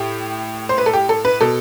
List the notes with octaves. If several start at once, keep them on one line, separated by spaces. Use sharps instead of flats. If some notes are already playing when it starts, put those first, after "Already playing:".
Already playing: A2 G4
C5
B4
A4
G4
A4
B4
B2 A4